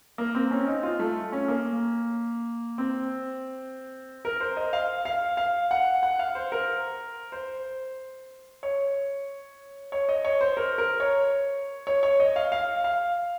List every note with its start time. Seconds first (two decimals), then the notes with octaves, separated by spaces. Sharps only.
0.18 A#3
0.35 C4
0.51 C#4
0.67 D#4
0.83 F4
0.99 A3
1.32 C#4
1.48 A#3
2.78 C4
4.25 A#4
4.40 C5
4.57 D#5
4.73 F5
5.05 F5
5.37 F5
5.71 F#5
6.03 F#5
6.19 F5
6.35 C5
6.52 A#4
7.32 C5
8.63 C#5
9.92 C#5
10.09 D#5
10.25 C#5
10.41 C5
10.57 A#4
10.78 A#4
11.00 C#5
11.87 C#5
12.03 C#5
12.20 D#5
12.36 F5
12.52 F5
12.84 F5